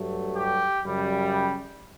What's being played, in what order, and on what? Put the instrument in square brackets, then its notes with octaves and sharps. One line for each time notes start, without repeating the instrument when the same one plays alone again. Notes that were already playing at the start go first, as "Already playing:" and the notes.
Already playing: [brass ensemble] G2 F#3 A3
G4
F#2 C#3 G3